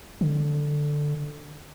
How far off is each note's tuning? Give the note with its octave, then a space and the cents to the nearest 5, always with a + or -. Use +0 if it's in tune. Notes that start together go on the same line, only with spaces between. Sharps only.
D3 +5